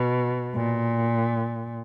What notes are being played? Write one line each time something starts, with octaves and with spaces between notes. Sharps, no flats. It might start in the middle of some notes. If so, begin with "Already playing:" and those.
Already playing: B2
A#2